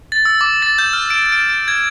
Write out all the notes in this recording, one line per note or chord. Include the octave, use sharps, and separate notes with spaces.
A6
E6
D6
A6
G6
F6
D7
D7
D7
G#6